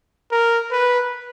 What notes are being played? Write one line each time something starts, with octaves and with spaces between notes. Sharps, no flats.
A#4
B4